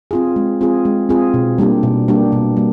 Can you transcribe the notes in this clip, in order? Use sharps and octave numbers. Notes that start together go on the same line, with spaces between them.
C4 F4 G#4
G#3
C4 F4 G#4
G#3
C4 F4 G#4
B2
G3 A#3 D4 G4
B2
G3 A#3 D4 G4
B2
G3 A#3